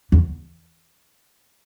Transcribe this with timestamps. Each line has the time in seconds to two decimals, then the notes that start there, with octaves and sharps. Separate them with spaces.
0.12 E2